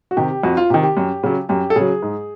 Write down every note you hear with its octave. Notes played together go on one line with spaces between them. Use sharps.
F#4
C3 D#3 G4
F2 F#4
F4
C3 D#3 G4
G4
F#2
C#3 F#3
F#2 G4
A4
C#3 F#3 G#4
G#2